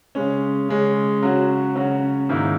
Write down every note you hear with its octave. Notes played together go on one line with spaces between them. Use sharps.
C#3 G#3 C#4
C#3 G#3 C#4
C#3 F#3 C#4 F#4
C#3 F#3 C#4 F#4
G#2 D#3 A#3 E4